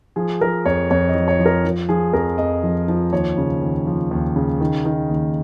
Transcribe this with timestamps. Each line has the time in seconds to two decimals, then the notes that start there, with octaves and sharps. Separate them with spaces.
0.16 F3 G#4
0.41 F3 A#4
0.66 F2 C#5
0.91 F2 C#5
1.09 D#5
1.15 F3
1.28 C#5
1.39 F3
1.46 A#4
1.65 F3
1.89 F3 G#4
2.13 F2 A#4
2.38 F2 D#5
2.63 F3
2.88 F3
3.12 D#2 C#5
3.38 C#3
3.62 D#2
3.87 F3
4.11 D#2
4.36 C#3
4.60 D#3
4.85 D#3
5.09 D#2